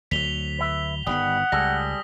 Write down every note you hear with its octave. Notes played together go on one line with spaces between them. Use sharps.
D2 F#3 B6 F7 G7
B4 E5
G1 D#3 G3 B3 F#5 D#6
C#2 G3 G#4 A4 A#6